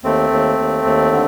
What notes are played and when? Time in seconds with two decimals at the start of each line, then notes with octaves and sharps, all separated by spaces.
0.03 D#2 A3 C4
0.31 D#2
0.58 D#2
0.85 D#2
1.12 D3